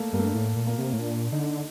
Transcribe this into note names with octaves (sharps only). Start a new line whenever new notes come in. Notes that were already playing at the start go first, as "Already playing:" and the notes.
Already playing: A3 A#3
G2 A#3
A3
A2
A#2
A#3
C3
A2
A#2 D4
D3 D#4